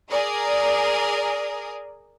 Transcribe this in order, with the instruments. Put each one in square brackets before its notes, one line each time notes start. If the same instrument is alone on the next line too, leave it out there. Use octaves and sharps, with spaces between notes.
[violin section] G#4 A#4 D5 D#6